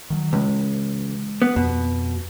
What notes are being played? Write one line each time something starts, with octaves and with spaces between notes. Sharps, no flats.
D#3 F3 F#3
C#2 E3 G#3
B3
F2 B2